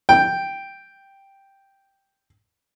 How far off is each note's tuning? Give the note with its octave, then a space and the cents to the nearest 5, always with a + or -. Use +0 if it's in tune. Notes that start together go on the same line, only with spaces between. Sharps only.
G5 +0